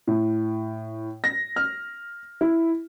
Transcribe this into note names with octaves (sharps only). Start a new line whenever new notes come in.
A2
A#6
F6
E4